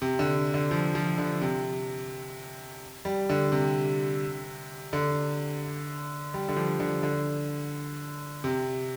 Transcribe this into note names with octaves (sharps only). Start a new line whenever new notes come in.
C3
D3
D3
F3
F3
D3
C3
G3
D3
C3
D3
G3
D3
F3
D3
D3
C3